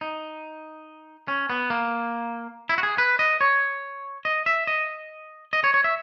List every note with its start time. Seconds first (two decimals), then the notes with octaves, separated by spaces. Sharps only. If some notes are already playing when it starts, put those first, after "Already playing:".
0.01 D#4
1.28 C#4
1.50 B3
1.70 A#3
2.69 E4
2.78 F#4
2.83 G#4
2.98 B4
3.19 D#5
3.41 C#5
4.25 D#5
4.46 E5
4.67 D#5
5.53 D#5
5.64 C#5
5.74 C#5
5.84 E5